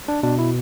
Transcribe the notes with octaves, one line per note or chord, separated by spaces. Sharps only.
D4
B2 D4
E4